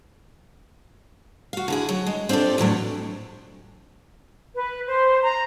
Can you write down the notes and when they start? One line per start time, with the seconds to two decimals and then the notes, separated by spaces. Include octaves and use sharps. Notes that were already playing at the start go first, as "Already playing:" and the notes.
1.53 F#4 F5
1.68 D3 E4 G#4
1.89 F#3
2.06 G#3
2.29 C4 D4 F4 G4 A4
2.58 E2 A2 F#3 D4
4.54 B4
4.87 C5
5.22 A#5